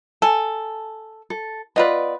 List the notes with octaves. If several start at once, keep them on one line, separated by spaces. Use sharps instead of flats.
A4 G#5
A4
B3 F4 B4 D5 D#5